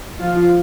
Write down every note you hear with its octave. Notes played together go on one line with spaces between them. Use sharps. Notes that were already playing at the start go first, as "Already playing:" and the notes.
F3 F4